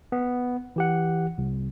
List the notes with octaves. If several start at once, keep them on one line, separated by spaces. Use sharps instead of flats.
B3
E3 G4 F#5
C2